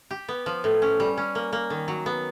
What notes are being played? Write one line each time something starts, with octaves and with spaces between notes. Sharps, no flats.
G4
B3
F3
A2
C#4
G3
C#4
A#3
A#3
D#3
F#3
B3